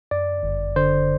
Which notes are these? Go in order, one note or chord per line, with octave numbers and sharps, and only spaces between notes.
F#2 D5
G1
D3 C5